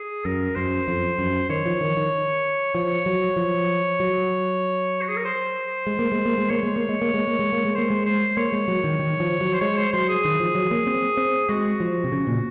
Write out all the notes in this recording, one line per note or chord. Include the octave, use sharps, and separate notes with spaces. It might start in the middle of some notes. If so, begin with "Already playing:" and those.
Already playing: G#4
F#2 A#4
F#2 C5
F2
F#2
D#3 C#5
F3
D#3
D#3
F3 C#5
F#3
F3
F#3
F#4
G#4
A#4
C5
G#3
A#3
G#3
A#3
G#3
A#3 C#5
G#3
A#3
G#3
A#3
G#3
A#3
G#3
A#3
G#3
A#3 C5
G#3
C5
A#3 C#5
G#3
F#3
D#3
D#3
F3
F#3
C5
G#3 C#5
C5
F#3 C5
G#4
D#3
F3
F#3
A#3
C4
C4
G#3 F#4
F3
C3
C#3
A#2